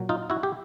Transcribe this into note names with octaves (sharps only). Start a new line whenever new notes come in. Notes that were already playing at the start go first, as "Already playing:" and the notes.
Already playing: A#2 F#3
D#4 F4
E4 F#4
G4